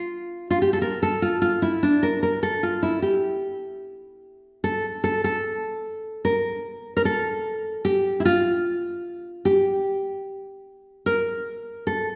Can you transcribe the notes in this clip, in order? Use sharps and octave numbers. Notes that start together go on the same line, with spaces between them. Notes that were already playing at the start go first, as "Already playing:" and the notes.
Already playing: F4
F4
G4
A4
A#4
A4
F4
F4
E4
D4
A#4
A#4
A4
F4
E4
G4
A4
A4
A4
A#4
A#4
A4
G4
E4
F4
G4
A#4
A4